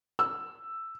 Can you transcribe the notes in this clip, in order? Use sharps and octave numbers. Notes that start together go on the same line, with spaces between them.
E6